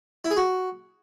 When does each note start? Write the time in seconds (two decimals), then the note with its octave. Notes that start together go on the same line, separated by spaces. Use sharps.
0.25 E4
0.31 G#4
0.37 F#4